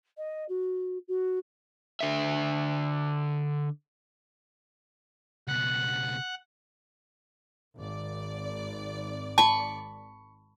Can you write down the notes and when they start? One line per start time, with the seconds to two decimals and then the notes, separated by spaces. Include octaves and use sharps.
0.17 D#5
0.49 F#4
1.08 F#4
2.01 D3 E5
5.48 C#2 B2 F#5
7.77 G#1 D5
9.38 A5 B5 C#6